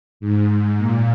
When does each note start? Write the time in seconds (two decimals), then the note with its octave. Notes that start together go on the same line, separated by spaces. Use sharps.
0.20 G#2
0.78 A#2